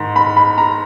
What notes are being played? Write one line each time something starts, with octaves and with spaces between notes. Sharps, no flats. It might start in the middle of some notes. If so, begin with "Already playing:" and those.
Already playing: G#2 D#3
B5
B5
A#5